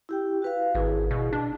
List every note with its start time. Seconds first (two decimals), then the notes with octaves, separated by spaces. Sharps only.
0.09 E4 G4 G5
0.42 F#4 B4 F5
0.75 G#1 E4 G#4
1.11 B2
1.33 D4